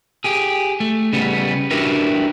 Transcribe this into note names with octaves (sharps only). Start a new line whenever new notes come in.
G4 G#4
A3
C#3 G3 B3
D4 E4 F#4 G4 A#4 B4